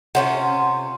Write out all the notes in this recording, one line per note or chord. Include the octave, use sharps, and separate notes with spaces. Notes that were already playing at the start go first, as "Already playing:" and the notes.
C3 C#4 F4 C5 F#5